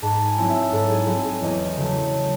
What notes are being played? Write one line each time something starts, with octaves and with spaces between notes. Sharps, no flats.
G#2 A5
G#5
F#3 C4 E4
E5
G#2 A4
G#4
F#3 C4 E4 G#4
G#4
E2 D#5
C#3 F#3 A3